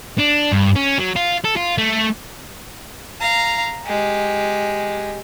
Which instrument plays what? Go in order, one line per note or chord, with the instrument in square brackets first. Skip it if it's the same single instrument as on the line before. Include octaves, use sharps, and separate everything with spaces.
[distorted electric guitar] D4
G2
C#4
F#3
F4
A4
F4
A3
[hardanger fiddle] F5 A#5
G#3 G4